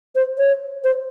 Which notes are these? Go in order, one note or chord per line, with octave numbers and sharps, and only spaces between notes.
C5
C#5
C5